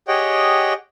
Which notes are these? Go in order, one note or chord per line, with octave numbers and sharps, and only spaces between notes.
G4 G#4 C#5 D#5 F#5 G5